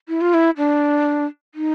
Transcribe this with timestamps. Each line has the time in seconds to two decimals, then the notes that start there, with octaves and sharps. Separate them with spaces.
0.08 E4
0.21 F4
0.34 E4
0.57 D4
1.55 D#4